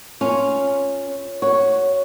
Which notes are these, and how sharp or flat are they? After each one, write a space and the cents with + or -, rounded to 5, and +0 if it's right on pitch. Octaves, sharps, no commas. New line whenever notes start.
C#4 +0 F4 +0
F#4 +0 C#5 +0